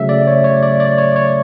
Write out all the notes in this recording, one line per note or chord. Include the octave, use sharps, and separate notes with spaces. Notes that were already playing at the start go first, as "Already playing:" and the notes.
Already playing: C#3 F#3 A3 E5
D5
C#5
C#5
D5
D5
C#5
C#5